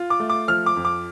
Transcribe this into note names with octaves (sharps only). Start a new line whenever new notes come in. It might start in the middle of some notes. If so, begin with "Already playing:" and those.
Already playing: F4
D6
A3
D6
F3 F6
D6
F2
D6